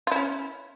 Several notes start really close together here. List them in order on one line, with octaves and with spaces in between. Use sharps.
F4 E4 C#4